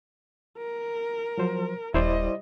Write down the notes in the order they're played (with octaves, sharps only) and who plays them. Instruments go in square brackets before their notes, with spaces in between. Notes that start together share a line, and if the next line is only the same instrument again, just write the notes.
[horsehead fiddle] A#4
[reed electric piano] F3 F#3 C5
[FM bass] D#1 [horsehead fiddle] G3 D#5 [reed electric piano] E4 C5 D5